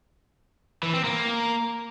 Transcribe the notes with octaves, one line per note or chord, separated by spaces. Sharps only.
E3
C4
A#3